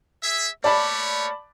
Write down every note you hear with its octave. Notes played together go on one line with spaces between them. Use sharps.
G#4 E5
A3 A#3 C#5 D5 A5 B5